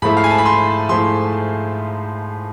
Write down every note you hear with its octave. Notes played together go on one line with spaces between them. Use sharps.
G#2 F3 A3 E4 B5
F5
G#5
A5
B5
C6
G#2 F3 A3 E4 C6